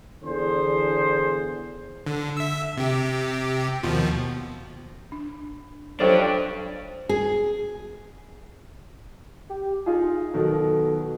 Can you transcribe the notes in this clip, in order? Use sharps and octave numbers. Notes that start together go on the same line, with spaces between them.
E2 D3 G#4 C5
D3
E5 E6
C3 G4
D#2 B2 F3
D4
F3 F#3 D4 G4 A4 C5 C#5
G#4
G4
D#4 F4 G#4
B2 D#3 F#3 A4